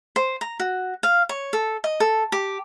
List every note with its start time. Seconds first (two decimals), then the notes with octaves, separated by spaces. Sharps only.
0.16 C5
0.41 A#5
0.60 F#4
1.03 F5
1.29 C#5
1.53 A4
1.84 D#5
2.00 A4
2.32 G4